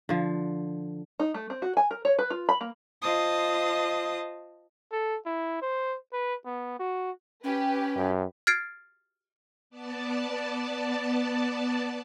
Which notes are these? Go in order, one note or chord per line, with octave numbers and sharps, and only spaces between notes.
D3 F3
D#4
A3
C4
F#4
G#5
A#4
C#5
B4
F4
B5
A#3
F4 C5 D#5 A5 D#6
A4
E4
C5
B4
B3
F#4
C#4 G4 B4
F#2
F6 G#6 A6 C7 D7
B3 D5 A5